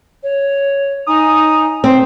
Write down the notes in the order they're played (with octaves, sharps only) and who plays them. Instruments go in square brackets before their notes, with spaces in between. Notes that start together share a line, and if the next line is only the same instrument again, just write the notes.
[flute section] C#5
[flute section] D#4 G#5 A#5 [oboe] D#6
[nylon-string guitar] C4 [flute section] C6